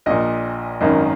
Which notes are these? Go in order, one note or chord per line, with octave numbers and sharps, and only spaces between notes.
A#1 A#2 D#5
G#1 F#2 D#3 D#5